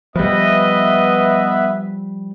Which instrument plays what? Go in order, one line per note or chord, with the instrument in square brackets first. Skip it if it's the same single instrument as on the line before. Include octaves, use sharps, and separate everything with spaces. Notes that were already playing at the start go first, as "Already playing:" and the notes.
[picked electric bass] F3 G3 [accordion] B3 B4 E5 [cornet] D#5